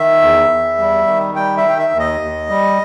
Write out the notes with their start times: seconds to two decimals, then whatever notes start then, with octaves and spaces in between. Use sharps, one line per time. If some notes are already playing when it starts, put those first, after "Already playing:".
Already playing: D#3 E5
0.21 E2
0.50 E2
0.78 G3
1.07 D#3
1.36 G3 G5
1.57 E5
1.64 D#3 G5
1.78 E5
1.93 D#2
1.99 D#5
2.21 D#2
2.49 G3